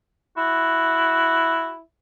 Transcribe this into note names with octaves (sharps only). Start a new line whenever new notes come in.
E4 F#4